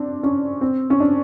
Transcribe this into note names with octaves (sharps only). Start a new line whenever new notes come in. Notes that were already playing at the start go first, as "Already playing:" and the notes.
Already playing: C4 D4
C#4
C4
C#4
D4